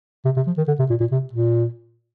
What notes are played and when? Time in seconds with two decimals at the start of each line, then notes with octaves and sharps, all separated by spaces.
0.25 C3
0.37 C3
0.47 F3
0.57 D#3
0.68 D3
0.79 C3
0.90 A#2
1.00 A#2
1.11 C3
1.33 A#2